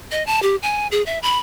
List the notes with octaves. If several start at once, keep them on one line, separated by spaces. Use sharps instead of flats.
D#5
A5
G4
G#5
G#4
E5
B5